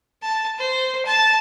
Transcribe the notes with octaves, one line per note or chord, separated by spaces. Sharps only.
A5
C5
A5